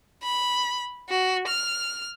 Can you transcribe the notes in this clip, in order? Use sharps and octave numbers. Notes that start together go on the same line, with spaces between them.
B5
F#4
F6